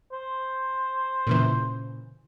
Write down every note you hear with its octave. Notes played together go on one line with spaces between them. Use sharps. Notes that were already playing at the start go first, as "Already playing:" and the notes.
C5
A#2 C#3 E3